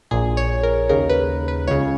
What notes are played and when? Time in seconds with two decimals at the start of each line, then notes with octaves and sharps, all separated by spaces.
0.11 A#1 A#2 G#4
0.37 C#5
0.63 A#4
0.89 D#2 C#3 A#4
1.09 B4
1.48 B4
1.67 C#2 C#3 C#5